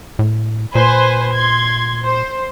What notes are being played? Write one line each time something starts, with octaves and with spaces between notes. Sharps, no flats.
A2
A#2 B4 C5 G#5
C6 G#6
C5